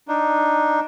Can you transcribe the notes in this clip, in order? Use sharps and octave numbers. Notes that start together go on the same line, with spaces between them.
D4 D#4